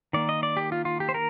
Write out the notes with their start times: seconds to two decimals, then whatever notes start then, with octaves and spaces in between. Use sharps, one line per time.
0.13 D#3 A#3 D5
0.29 D#5
0.43 D5
0.57 G4
0.72 F4
0.85 F4
1.00 G4
1.09 C5
1.14 A#4